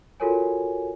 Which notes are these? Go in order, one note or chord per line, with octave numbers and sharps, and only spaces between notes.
F4 F#4 A4 A#4 C#5 G#5